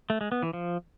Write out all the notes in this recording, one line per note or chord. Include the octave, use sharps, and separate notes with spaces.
A3
G#3
B3
E3
F3